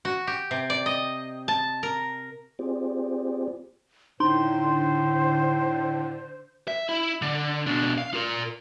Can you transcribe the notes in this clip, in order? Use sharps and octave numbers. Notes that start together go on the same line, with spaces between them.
F#4
G4
C3
D5
D#5
A5
A#4
C4 F4 G4 G#4 C5 D5
A2 D3 D#4 C5 C6
E5
E4
D3
B2 D4
F5
F4 A#4